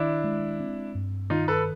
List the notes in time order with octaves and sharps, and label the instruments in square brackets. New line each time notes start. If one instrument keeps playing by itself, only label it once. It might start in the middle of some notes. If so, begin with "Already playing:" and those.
Already playing: [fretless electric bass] D#3 [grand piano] D4 E4
[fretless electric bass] G#3
C4
G2
[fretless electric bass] D#3 [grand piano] D#4 F4
[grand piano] A4 B4